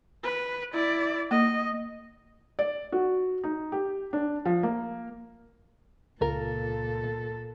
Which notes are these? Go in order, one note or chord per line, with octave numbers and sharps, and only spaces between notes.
B4
E4 D5
A#3 D#5
D5
F#4
D#4
G4
D4
F3
A#3
C#2 A#2 F4 A4 A#4